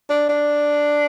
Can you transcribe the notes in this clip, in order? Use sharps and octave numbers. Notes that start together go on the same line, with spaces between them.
D4
D4